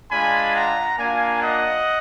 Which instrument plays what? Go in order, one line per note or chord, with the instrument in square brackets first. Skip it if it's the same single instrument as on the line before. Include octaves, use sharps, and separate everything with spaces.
[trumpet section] G#3 D4 F4 G#5 B5
F#5 A#5
A#3 D4 F4 F5 G#5
D#5 F#5